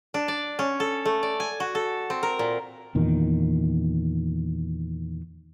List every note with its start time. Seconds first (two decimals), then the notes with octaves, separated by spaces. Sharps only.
0.14 D4
0.28 D5
0.59 C#4
0.80 A4
1.05 A3
1.23 D5
1.40 G#5
1.60 F#4
1.75 A4
2.10 C4
2.23 A#4
2.39 A#2
2.95 E2 A#2 D#3